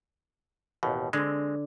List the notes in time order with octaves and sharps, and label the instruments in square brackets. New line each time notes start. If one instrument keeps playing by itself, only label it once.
[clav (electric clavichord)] A1 D#2 B2
[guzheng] D3 [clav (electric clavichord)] G#3 C4